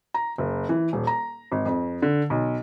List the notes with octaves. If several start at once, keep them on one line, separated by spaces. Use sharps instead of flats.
A#5
F#1
E3
D#1
A#5
G#1
F2
D3
B1